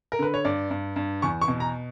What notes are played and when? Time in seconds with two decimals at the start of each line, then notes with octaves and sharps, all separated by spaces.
0.12 A#4
0.19 D3 B4
0.34 C#5
0.45 G2 D5
0.70 G2
0.96 G2
1.22 E2 C#6
1.41 C#6
1.48 B2
1.60 A#5